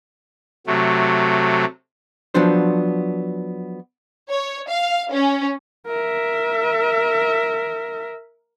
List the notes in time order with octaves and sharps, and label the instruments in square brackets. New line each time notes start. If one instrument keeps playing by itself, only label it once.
[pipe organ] C3 F#3 A3
[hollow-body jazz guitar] F3 F#3 B3 D4 C5
[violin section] C#5
F5
C#4
[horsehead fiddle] A#4 E5